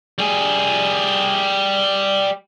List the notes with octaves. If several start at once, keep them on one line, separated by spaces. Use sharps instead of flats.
G3 G#4